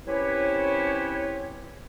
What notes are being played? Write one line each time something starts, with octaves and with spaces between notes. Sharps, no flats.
C4 C#4 E4 G4 B4 C#5